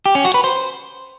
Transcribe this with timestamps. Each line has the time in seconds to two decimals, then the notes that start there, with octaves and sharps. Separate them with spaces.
0.06 G4
0.15 C#4
0.25 F#4
0.34 B4
0.44 C5